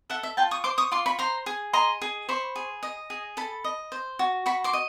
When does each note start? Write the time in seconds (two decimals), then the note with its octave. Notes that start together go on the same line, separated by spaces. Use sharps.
0.10 A4 E5 F#5
0.23 E5
0.37 F4 G5 A5
0.51 C#6 D#6
0.64 C5 C6 D6
0.78 C#6 D#6
0.92 F4 C6 D6
1.06 B5 C#6
1.19 C5 A#5 C6
1.46 G#4
1.73 D#5 A#5 C6
2.02 G#4
2.29 C5 B5 C#6
2.56 G#4
2.83 D#5
3.10 G#4
3.37 A4 A5 B5
3.64 D#5
3.92 C5
4.19 F#4
4.46 F#4 B5 C#6
4.64 C6 D6
4.73 D#5